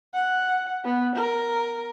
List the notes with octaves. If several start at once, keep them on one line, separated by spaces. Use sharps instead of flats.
F#5
B3
A#4